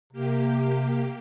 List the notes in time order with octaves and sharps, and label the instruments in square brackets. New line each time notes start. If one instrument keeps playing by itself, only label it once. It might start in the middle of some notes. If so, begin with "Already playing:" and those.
[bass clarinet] C3 [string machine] A#3 G4